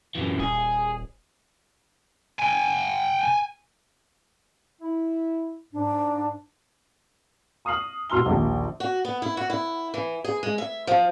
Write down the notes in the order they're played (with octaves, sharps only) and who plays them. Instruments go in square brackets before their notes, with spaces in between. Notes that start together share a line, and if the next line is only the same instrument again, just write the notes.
[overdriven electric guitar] F#2 E3
[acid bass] D#1 [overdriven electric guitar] G#4
[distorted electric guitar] G5 G#5
[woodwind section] E4
[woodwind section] G#2 [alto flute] D4
[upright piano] C#6 D#6 F6 C7 F#7
B2 F#4 C6 E6 F6 G7
A#1 D#2
[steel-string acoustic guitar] F#4
B3
E4
F#4
E4
E3
G#4
G#3
E5
F3